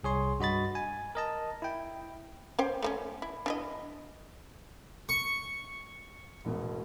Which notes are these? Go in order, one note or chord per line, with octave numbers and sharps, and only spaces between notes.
C2 G#4 C#5 C6
G2 F#4 D#5 B5 A6
G#5
A#4 D#5 A5
E4 G5
C#4 C5 G5
A3 A#3 C#4
E4
D4 E4 D#5
C#6
E1 A1 B2